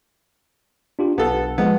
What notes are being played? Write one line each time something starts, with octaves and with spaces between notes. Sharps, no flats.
D4 F4 G4
B1 B3 A4
F3 G#3 B3